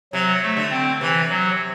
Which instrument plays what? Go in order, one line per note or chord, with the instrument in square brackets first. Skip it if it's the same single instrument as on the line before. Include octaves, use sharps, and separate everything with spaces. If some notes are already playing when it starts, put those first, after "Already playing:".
[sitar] C3 [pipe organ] F#3
[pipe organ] A3
[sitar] D3
[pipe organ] C4
[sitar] C3 [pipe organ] E3
[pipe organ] F#3